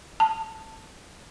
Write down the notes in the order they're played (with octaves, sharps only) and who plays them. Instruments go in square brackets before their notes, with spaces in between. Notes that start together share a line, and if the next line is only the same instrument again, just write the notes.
[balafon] A5